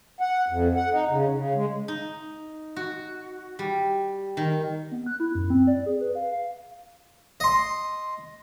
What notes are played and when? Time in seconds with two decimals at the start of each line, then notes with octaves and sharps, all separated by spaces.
0.21 F#5
0.49 F2
0.76 F#5
0.91 D#4
1.10 C#3
1.34 C#3
1.55 G#3
1.88 D#4
2.76 F#4
3.59 G3
4.37 D#3
4.92 B3
5.06 F#6
5.20 E4
5.35 F#2
5.50 C4
5.67 D5
5.86 G#4
6.01 B4
6.15 F5
6.32 F5
7.40 D#5 C6